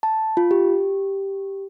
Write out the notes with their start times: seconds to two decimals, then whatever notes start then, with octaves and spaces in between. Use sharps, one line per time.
0.03 A5
0.37 F4
0.51 G4